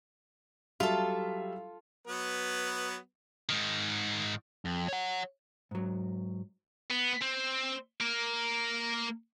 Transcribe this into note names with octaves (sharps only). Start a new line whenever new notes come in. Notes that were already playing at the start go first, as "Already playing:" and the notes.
F#3 G3 F4 A4 E5
F#3 B3 B4
G#2 D#3
F2
C#5 F#5
G#2 F#3
B3
C4
A#3 A#4